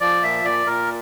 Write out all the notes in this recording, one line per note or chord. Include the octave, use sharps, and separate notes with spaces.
F3 D5
A#2 E5
A#2 D5
A#2 A#4